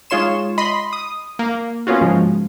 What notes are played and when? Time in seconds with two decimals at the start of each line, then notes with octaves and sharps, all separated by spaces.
0.10 G#3 D#4 F4 C#5 C6 E7
0.58 D#5 B5 C6
0.93 D#6
1.39 A#3
1.87 A#3 B3 C#4 F4 F#4
2.01 G#2 C#3 F3 G#3